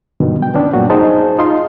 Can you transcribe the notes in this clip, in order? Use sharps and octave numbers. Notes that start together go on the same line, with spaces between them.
G2 B2 D3 D#3 F#3
G5
B3 C#4 D4
G2 A#2 F#3 F#4
D#4 G#4 C5 A5
D#4 F4 C6